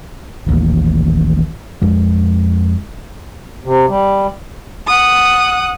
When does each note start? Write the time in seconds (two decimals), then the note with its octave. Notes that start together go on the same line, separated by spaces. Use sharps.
0.46 D#1 A1 D#2
1.82 F2 G#3
3.64 C3
3.88 G3
4.87 F#5 D#6